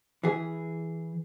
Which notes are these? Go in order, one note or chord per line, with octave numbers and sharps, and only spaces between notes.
E3 G#4